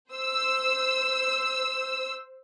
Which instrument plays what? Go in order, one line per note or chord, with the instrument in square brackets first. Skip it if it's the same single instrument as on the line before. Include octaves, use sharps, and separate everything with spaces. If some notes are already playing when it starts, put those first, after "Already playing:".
[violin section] C5 E6